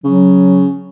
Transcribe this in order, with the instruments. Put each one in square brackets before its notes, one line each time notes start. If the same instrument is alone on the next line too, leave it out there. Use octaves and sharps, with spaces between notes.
[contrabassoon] C#3 [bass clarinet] F#3